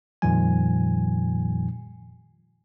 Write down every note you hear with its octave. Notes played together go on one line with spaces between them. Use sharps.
F2 A#2 D#3 F3 G3 G#5